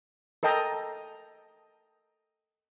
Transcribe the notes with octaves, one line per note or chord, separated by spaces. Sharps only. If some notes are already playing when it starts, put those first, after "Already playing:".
A4 A#4 D#5 G5 A5 A#5